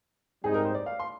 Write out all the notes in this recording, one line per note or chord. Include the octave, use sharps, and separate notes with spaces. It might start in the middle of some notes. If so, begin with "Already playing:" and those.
G#2 G3 C4 D#4 G4 G#4
A#4
C5
D5
F5
C6